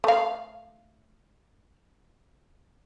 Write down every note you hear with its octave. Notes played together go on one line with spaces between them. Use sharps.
A3 F5